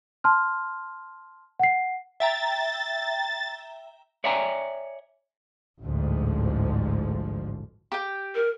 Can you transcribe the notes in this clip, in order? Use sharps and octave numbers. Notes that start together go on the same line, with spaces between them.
A5 C6 F6
F#5 C7
E5 G5 A#5 A6
C#5 D5 E5 G5 G#5 A#5
A1 D2 G#2 F3
G4 G5
A#4